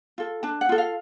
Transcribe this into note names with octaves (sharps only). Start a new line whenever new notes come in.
F4 A4
D4 A5
F#5
F4 A4
F5